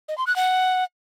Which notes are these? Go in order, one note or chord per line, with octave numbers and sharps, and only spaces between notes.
D#5
C6
F#6
F#5